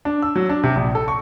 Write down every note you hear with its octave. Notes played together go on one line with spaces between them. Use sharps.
D4
E6
F#3
D4
C3
A#1
A4
C#6